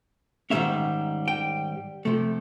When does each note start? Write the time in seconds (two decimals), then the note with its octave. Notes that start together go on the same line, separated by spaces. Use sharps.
0.50 G#2 D#3 G3 A#3 C#4 E5
1.28 G5
2.05 C3 F3 A3